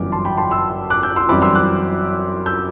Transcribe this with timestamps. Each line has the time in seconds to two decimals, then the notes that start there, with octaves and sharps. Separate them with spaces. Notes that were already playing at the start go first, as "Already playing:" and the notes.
Already playing: G1 F#2 E3 G3 D6
0.12 A5 C6
0.25 G5 B5
0.38 A5 C6
0.51 C6 E6
0.90 D6 F#6
1.03 E6 G6
1.16 C6 E6
1.29 F#2 E3 G3 C4 B5 D6
1.42 C6 E6
1.55 D6 F#6
2.46 E6 G6